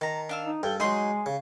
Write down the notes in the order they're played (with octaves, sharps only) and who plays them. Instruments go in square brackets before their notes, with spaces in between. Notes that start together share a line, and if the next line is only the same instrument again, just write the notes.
[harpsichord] D#3 [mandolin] A5 A#5
[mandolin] D4 F5 E6
[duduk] D#4
[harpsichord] G2 [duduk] A4 [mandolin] G5
[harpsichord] F#3 D#4 [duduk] G#3 [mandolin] G#4 C6
[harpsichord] C#3